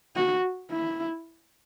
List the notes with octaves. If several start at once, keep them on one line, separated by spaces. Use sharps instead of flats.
F#4
E4